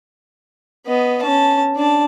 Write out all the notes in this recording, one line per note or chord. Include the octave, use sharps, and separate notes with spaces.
B3 D#5
C#4 A5
D4 A5